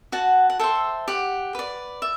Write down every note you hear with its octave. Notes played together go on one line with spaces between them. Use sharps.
F#4 F#5 A5
F#5
A4 C5 E5 G5
G4 F#5
B4 D5
E5